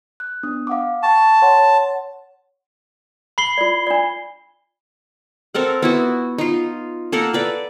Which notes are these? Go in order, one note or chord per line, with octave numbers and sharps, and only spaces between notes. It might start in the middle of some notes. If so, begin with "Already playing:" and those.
F#6
B3 D4 D#6
F5 F#5 D6
G5 A5 C#6
C#5 F#5 C6
B5 C7 G7
F4 D5
D4 D5
C4 A4 A#4 F#5
B3 E4 F#4
D#4 F4
A#3 A4 A#4 F#5
A4 B4 D5